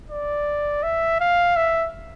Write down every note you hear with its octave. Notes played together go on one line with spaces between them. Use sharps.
D5
E5
F5
E5